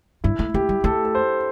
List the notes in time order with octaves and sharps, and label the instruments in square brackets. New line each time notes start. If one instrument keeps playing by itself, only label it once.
[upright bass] G2 [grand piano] E4
[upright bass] A3
[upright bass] A3 [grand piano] G4
[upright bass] G3
[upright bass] A3 [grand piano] A4
[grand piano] A4
C5